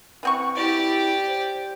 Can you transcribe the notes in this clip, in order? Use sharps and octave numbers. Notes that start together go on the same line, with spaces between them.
E3 C4 F#5 C#6
E4 G4 D5
C5